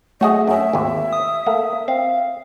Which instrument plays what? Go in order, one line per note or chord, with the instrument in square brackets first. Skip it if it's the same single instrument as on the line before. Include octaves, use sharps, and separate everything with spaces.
[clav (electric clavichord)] F#3 F#4 G#4 [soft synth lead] A3 [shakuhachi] D#5
[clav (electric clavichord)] F#2 C#4 [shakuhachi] E5
[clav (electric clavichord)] G#1 D#2
[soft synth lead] D#6
[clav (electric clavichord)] A3 A#3
[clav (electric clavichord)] C4 [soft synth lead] F5